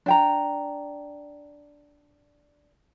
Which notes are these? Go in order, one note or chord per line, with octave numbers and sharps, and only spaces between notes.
D4 G5 A#5